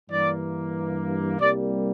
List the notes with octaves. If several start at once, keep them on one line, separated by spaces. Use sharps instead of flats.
G2 E3 A#3 D5
C2 C3 G3 A#3 D5